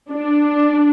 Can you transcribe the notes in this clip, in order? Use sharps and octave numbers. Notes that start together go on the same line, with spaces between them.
D4